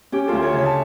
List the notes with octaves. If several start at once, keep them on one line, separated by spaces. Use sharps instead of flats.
C#4 G4
D2 F4 A4
A4 C#5
C#3
C#5 E5
A5